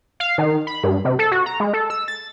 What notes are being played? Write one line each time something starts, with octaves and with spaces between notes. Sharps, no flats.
F5
D#3
B5
G2
C3
A4
F#4
A#5
G#3
A4
E6
A6